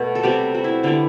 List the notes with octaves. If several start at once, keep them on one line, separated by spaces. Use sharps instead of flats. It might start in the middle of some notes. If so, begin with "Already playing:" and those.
Already playing: B2 A3
A4
C3 G3 B3 G4
F#4
E4
D3 G3 B3 E4